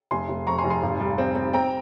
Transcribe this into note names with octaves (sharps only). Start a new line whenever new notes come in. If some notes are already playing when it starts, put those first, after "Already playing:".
F1 G#5 C6
F1
F2 A#5 C#6
G#5 C6
F1
G#5 C6
G#1
G3
C4
C4
C4 G5 A#5